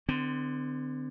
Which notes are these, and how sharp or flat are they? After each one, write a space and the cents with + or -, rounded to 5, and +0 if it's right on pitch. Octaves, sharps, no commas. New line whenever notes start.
D3 +20 C4 -35